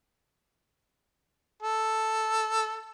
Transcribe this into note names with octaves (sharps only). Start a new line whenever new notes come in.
A4